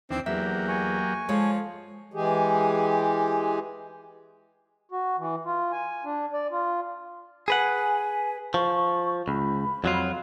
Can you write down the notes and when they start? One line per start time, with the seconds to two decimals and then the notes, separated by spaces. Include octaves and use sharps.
0.11 D#2 E3 C4 D4
0.26 E2 F#3 A#3 G4 E5
0.69 G#5 C#6
1.29 F3 G#3 A4 C#5
2.14 E3 G#3 G4 G#4
4.91 F#4
5.18 E3
5.45 F4
5.72 G#5
6.04 D4
6.33 D5
6.51 F4
7.48 G#4 B4 F#5 G#5
8.54 F3 C#6
9.28 C#2 B5
9.84 F2 F#3 F4